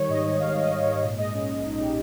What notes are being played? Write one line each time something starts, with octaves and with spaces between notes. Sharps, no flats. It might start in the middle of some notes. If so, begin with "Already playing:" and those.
Already playing: D#3 G3 C#5
G#2 D#5
G#2 C#5
D#3 F5
G3
D#5
G#2
C#5
G#2
A#2 D#5
G#3 D#5
C#4 D#5
A#1
A#2 D#4
G#3 G4